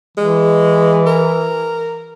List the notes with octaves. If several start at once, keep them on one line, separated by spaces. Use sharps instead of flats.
E3 G#3
A#4